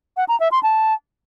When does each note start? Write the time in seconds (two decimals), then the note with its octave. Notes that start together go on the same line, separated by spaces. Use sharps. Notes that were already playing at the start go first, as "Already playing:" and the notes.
0.17 F#5
0.28 A#5
0.40 E5
0.51 C6
0.63 A5